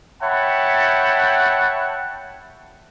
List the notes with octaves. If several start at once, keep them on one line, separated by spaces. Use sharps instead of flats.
C#5 E5 F#5 G5 A5 B5